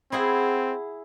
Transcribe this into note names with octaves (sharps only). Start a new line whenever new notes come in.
C4 E4 G#4 F#5